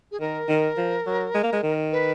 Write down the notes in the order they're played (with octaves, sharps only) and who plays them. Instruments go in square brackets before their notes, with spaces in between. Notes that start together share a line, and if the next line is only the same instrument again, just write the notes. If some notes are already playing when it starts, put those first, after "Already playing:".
[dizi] G#4
[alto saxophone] D#3 [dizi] A#4
[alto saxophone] D#3
F3
F#3
G#3
A#3
G#3
D#3
[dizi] B4